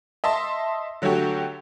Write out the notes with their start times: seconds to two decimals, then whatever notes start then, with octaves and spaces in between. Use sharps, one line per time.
0.24 D#5 E5 A5 C6
1.02 D3 F#3 A3 F#4 G4